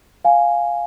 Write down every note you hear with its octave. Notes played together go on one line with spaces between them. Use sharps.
F5 G#5